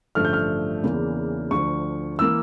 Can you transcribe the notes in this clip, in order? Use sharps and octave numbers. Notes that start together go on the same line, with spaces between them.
A1 G2 D3 F3 A3 F6
G6
F6
E2 C#3 E3 A#3 D4
D2 D3 F3 C#6
E3 A#3 E6